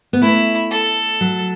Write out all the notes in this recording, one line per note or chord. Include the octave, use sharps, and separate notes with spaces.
B3
A3 E4
A4
F#3